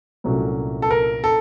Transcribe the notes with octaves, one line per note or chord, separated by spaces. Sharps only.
C2 A#2 F#3 A3 C#4
A4
A#4
A4